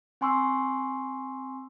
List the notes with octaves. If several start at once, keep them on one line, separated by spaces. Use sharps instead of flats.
C4 G#5 C6 C#6 E6